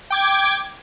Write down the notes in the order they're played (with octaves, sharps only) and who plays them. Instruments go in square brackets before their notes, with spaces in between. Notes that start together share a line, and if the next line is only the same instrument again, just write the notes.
[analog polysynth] G5 D6 G#6